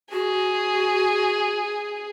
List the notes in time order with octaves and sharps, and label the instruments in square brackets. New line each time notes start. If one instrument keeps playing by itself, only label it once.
[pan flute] F#4 [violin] G#4